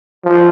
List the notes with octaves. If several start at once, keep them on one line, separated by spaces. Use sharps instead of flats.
F3